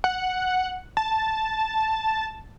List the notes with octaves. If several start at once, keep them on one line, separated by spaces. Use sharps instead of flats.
F#5
A5